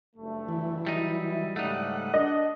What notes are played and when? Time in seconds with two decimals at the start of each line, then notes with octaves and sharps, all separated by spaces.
0.16 F#1 G2 A3
0.48 E3
0.87 F#3 G3 D#4 E4
1.56 G#2 C#3 G3 A3 D#4 F#5
2.14 D4 D#5